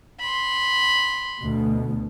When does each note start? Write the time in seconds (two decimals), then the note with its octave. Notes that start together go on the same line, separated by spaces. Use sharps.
0.20 B5 C6
1.42 D2 B2